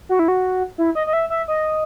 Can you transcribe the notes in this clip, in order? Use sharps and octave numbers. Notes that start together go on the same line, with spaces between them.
F#4
E4
F#4
E4
D#5
D#5
E5
E5
D#5